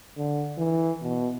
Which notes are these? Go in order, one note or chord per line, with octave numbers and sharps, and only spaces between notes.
D3
E3
B2